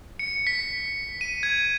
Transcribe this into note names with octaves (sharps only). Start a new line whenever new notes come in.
C#7
B6
D#7
G#6